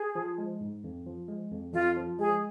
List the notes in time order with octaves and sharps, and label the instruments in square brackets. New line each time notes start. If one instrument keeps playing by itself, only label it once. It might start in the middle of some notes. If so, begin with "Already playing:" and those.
Already playing: [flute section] G#4
[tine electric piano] F3
G#3
G#2
F2
F3
G#3
F2
[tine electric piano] F2 [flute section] F4
[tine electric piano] F3
[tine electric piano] G#3 [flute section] G#4